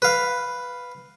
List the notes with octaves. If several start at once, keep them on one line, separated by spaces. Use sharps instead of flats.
B4 F5